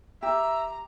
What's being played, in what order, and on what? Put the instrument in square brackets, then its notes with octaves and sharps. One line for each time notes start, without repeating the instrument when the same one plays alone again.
[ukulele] G4 [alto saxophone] E5 [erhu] A#5